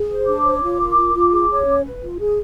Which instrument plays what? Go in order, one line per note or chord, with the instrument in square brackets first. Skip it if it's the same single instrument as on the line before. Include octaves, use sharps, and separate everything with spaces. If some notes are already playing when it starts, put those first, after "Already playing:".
Already playing: [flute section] G#4
C5
D4 D6
C#5
F4
A#4
F4
F4
G#4
C#5
C#4
B4
F4
G#4